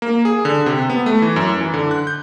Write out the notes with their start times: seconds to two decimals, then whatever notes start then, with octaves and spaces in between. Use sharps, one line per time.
0.02 A#3
0.25 G#4
0.45 D3
0.66 C3
0.90 B3
1.06 A3
1.22 E3
1.36 F#2
1.61 E3
1.74 D3
1.91 F#6
2.07 G6